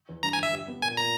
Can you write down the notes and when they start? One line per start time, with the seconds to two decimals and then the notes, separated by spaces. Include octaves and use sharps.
0.09 E2
0.23 G2 A#5
0.33 G#5
0.38 G1 E5
0.53 G3
0.68 B3
0.82 A#2 G#5
0.97 A#2 A#5